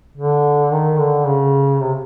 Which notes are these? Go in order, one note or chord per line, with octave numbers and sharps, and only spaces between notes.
D3
D#3
D3
C#3
C3